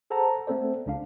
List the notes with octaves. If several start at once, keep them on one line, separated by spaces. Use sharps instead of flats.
G#4 A4 C5 F#5 A5 A#5
A3 B3 C4 A4 C5 D5
C#2 D4 F5